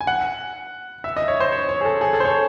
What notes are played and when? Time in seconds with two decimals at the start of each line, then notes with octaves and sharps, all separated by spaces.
0.01 G#5
0.07 F#5
1.04 E5
1.17 D#5
1.28 C#5
1.40 C5
1.52 C#5
1.69 C#5
1.81 G#4
1.85 A4
2.01 G#4
2.13 A4
2.20 C5
2.25 C#5